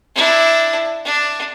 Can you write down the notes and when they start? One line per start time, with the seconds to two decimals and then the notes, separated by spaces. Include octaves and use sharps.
0.15 D4 E4
1.05 D4